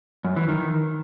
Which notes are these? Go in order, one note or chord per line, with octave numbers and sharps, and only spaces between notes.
F#2
E3
D#3